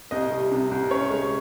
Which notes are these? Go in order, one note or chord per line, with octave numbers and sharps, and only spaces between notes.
C2 D#5
G3
C3
C2
C#4 C#5
G#3